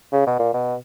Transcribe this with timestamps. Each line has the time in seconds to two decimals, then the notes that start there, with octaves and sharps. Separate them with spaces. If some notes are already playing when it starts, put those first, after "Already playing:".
0.13 C#3
0.27 B2
0.39 A#2
0.54 B2